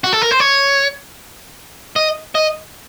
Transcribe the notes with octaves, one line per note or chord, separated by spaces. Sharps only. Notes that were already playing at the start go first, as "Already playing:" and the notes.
F#4
A4
A#4
C5
C#5
D#5
D#5